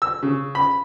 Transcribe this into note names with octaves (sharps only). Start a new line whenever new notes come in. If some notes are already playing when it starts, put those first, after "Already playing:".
E6
C#3
B5